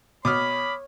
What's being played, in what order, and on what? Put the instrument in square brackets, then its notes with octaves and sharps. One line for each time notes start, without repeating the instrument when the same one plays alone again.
[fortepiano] B2 [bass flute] C#5 [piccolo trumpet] B5 [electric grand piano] D6 D#6 F6